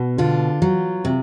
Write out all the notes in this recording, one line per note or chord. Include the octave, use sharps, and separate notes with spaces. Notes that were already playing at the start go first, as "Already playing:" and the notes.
Already playing: B2
D3 F4
F#3
C3